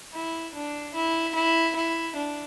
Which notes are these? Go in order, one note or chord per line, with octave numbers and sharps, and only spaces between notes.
E4
D4
E4
E4
E4
D4